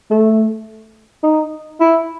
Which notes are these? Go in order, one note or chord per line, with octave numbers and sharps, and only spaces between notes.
A3
D#4
E4